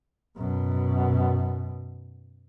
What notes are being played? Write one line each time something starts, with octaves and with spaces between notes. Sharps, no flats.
F#2 B2